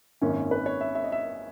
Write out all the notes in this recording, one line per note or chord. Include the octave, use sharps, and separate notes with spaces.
G#1 F#2 D#3 A#3 C#4
B4
C#5
E5
E5
D#5
E5